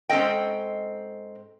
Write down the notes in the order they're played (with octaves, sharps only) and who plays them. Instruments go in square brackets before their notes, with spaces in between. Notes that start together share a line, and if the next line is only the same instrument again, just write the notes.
[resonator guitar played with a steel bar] G#2 C4 C#4 A4 D#5 G5